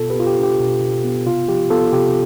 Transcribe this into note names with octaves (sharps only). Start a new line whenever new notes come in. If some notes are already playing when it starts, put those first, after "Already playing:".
Already playing: B2 B3 F4 A4
G4 B4
B3 F4
G4
D4
G4
B2
B2
B3
C3 F4
F3 G4
B3 F4 A4
C3 G4